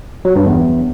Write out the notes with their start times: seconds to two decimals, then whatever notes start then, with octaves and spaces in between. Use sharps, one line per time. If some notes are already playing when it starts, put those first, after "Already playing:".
0.25 F#3
0.36 G2
0.46 E2